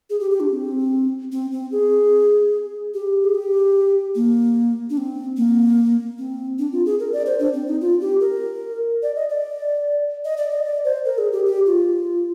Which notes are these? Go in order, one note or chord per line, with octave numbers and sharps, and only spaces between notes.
G#4
G4
G4
D4
C4
C4
C4
G#4
G4
G#4
G4
A#3
D4
C4
A#3
C4
D4
F4
G#4
A#4
D5
C5
D4
C4
D#4
F4
G4
A#4
D5
D#5
D5
D#5
D5
D#5
D5
C5
A#4
G#4
G4
G4
F4